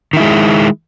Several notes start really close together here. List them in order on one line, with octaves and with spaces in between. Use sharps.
D#3 E4 G#3